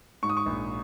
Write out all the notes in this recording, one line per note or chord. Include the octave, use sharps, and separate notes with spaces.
G#2 C#6
D#6
C#6
A#1